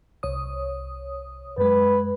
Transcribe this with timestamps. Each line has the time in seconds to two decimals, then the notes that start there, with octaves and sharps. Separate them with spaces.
0.23 C2 C#5 D#6
1.58 F#2 G#3 B4